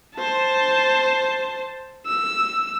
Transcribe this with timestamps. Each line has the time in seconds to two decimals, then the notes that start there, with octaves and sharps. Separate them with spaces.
0.16 C5 A5
2.07 E6